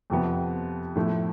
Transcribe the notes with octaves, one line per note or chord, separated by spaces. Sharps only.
F2 C3 F3 B3
A2 F3 A3 E4